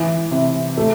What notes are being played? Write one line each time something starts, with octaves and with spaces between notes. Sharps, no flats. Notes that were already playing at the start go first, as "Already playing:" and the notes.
Already playing: E3
C3
A3